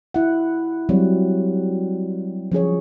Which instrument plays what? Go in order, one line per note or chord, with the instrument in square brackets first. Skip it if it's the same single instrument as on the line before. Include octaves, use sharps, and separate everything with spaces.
[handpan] E4 F#5
F#3 G3 C4
F3 C#4 G#4 C#5